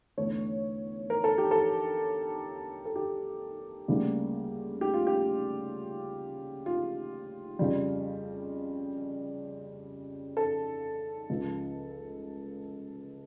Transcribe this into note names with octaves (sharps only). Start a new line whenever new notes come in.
E2 D3 A3 C#5
A#4
A4
G4
A4
A4
G4
D2 C#3 G3 A#3
G4
F4
G4
F4
F2 C#3 G3
A4
C#2 C#3 F3